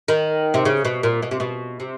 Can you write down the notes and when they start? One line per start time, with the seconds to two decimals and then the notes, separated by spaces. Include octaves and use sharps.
0.08 D#3
0.54 C3
0.65 C#3
0.85 B2
1.03 A#2
1.22 B2
1.31 C3
1.40 B2
1.80 C3